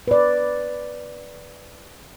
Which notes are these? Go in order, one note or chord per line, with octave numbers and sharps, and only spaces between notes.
B4 D5